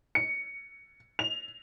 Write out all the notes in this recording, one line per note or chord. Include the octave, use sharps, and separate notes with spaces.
C#7
F7